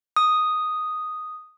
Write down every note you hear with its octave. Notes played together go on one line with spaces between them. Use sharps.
D#6